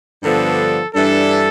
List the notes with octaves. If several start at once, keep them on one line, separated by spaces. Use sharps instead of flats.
G2 D3 F3 B3 D4 A4
G2 E3 G3 D4 A4